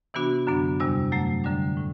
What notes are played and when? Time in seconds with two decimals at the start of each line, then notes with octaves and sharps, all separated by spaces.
0.14 C3 E3 B3 D4 F#4
0.47 F#2 D3 F#3 B3 D4
0.80 E2 C3 G3 D4
1.12 F#2 F#3 A3
1.44 F#2 D3 G3 D4
1.77 A2 E3